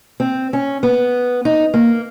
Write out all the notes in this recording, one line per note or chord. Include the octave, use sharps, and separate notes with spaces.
C4
C#4
B3
D#4
A#3